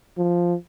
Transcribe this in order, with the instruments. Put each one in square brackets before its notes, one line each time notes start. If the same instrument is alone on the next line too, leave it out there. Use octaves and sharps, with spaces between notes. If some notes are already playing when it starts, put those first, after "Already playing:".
[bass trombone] F3